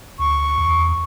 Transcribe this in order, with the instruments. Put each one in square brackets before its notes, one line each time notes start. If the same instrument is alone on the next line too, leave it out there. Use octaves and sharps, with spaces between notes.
[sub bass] D2 [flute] C#6
[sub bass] E2